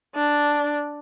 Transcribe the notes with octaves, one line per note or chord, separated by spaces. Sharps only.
D4